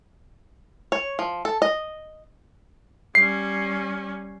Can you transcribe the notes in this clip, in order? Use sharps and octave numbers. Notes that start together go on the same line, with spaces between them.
C#5
F3
A4
D#5
G3 C#4 C7